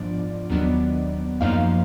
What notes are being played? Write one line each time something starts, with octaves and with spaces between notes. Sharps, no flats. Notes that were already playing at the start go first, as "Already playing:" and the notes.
Already playing: G#2 F3 B3 D4 F4 D5
D#2 D#3 F#3 B3 D4
F#2 F3 A#3 D#4 F5